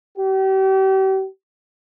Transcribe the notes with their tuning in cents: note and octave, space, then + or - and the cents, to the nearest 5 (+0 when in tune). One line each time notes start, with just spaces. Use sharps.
G4 -40